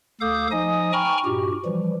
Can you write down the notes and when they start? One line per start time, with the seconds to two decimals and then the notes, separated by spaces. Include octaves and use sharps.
0.21 D2 A4 F5 D6 D#6 G6
0.51 F3 D#4 D#5 G#5 D#6
0.93 G5 G#5 A#5 B5 C#6 F6
1.25 G2 A#2 F#4 G4
1.65 E3 F3 G3